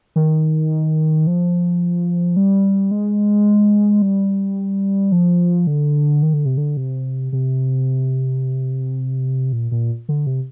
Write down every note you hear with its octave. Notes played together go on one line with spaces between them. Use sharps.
D#3
F3
G3
G#3
G3
F3
D3
D#3
D3
C3
D3
C3
C3
A#2
A#2
D3
C3